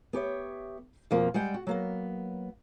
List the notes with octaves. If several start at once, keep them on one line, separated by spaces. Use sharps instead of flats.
B3 G4 C#5 E5
F2 B2 F3 A#3 C4
G3 G#3 F#5 G5
F#4
F#3 A#3 B3